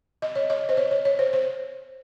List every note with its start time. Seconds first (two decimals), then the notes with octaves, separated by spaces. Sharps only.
0.22 D#5
0.35 C#5
0.50 D#5
0.69 C5
0.77 C#5
0.91 C#5
1.05 C#5
1.19 C5
1.33 C5